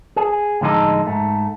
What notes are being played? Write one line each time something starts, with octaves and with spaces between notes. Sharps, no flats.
G#4
A2 D3 F3 G#3 D#4 A4
G#2 A3